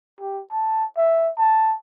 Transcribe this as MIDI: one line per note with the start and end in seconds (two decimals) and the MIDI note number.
0.20 0.42 67
0.52 0.85 81
0.97 1.31 76
1.38 1.75 81